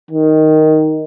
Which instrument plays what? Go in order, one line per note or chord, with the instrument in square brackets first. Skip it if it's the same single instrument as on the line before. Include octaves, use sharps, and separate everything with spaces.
[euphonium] D#3